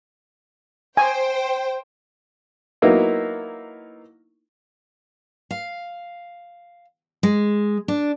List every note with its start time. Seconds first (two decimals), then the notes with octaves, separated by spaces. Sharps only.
0.97 C5 G5 G#5
2.82 F#3 A#3 B3 D#4 E4
5.51 F5
7.23 G#3
7.88 D4